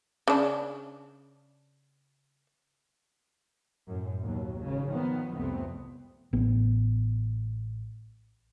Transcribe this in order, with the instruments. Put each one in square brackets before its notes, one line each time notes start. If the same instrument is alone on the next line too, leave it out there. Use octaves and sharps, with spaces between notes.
[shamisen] C#3 D4
[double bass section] F#2 A2
D#2 B2 F#3
G#1 C#3
D#3 F3 B3
C2 F2 A3 B3 C4
[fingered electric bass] A1 B3